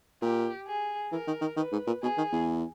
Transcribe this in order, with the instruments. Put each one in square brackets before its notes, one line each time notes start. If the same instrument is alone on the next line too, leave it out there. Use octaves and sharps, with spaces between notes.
[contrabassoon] A#2 [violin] G4
[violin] G#4
[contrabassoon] E3 [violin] A#4
[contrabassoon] D#3
D#3
[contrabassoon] D#3 [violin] B4
[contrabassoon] G#2
A#2
[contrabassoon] B2 [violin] G#4
[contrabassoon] D#3
E2